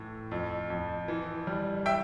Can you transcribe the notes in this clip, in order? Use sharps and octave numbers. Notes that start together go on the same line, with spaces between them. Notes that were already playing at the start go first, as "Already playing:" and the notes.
Already playing: A2 E3
F2
F2
E3
G3
E5 G5